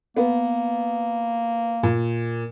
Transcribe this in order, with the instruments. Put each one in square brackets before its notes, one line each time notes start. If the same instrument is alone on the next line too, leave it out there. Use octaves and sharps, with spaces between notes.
[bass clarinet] A#3 [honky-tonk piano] B3
[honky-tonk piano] A#2